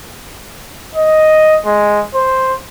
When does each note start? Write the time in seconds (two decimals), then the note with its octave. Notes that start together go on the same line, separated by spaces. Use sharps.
0.95 D#5
1.66 G#3
2.14 C5